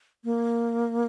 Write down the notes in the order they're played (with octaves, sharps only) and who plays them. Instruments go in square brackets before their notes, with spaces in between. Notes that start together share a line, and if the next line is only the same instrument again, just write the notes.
[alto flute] A#3